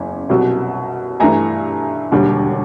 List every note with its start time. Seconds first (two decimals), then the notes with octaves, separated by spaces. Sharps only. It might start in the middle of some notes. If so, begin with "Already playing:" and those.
Already playing: F#1 E2 C#3
0.29 C2 B2 F#3
1.20 G2 E3 A3 G#5 A#5
2.12 E1 D#2 D3 G3